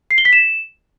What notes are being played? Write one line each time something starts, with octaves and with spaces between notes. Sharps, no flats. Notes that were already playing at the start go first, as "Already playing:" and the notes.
C7
G7
B6
E7